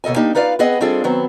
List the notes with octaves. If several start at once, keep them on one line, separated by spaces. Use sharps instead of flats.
D#2 B2 A4 D#5 G#5
A#3 D4 D#4 G4
D#4 F4 B4 D5 F5
B3 C4 G#4 D#5 F#5
G3 C4 D4 F4 G#4 A4
D#3 F#3 B3 C4